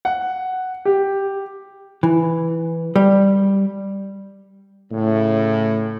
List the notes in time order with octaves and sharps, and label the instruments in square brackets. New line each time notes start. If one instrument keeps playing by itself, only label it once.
[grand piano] F#5
G4
[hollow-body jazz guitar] E3
G3
[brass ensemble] A2 C#3